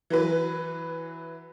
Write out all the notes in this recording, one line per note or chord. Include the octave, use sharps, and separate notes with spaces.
E3 F#3 B4